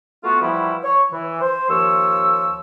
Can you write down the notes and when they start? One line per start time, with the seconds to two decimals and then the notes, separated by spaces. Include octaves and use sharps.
0.24 A3 B3 F4 F#4
0.41 E3 F3 G3 E4 F#4
0.84 C#5
1.12 E3
1.41 C5
1.70 D#2 F3 C#5 E6